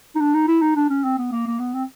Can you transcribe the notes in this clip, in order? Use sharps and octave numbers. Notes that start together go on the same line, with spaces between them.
D#4
D4
D#4
E4
D#4
D4
C#4
C4
B3
A#3
A#3
B3
C4